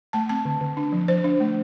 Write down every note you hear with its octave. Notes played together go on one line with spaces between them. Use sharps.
A3 A5
C4 A5
D3
D3
D4
F3
F3 C5
D4
A3